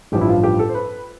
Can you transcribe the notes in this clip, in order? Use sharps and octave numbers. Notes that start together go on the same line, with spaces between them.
A1 G2 F3 G4
E4
F4
G4
A4
C5
B4